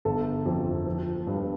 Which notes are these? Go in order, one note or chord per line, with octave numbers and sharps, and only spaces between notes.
G1 A4
F2
F3
G2